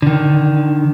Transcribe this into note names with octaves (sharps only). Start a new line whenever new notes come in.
D3 D#3